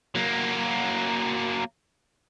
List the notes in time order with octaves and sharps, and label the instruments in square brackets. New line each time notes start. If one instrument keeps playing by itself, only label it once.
[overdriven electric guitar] F#3 A#3